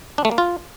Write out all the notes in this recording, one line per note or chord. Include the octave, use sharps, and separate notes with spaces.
D4
A3
A#3
F4